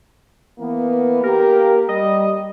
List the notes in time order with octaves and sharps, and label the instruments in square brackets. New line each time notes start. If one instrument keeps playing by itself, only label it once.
[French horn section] E3 A#3 B3
[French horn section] A#3 G4 [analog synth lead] A#4
[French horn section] G3 [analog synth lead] D#5